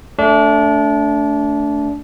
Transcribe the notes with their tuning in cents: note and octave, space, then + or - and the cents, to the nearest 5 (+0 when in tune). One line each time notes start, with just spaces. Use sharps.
A3 +0 D4 -25